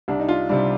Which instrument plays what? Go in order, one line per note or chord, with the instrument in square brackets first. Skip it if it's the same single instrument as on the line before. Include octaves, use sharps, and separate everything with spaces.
[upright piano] C2 D4
D#4
F4
C3 G3 D4